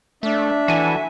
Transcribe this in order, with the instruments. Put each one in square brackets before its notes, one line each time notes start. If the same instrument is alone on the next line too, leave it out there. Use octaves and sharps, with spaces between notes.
[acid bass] A3 [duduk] D4 [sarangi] E5
[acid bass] E3 [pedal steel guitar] F#4 A4 G#5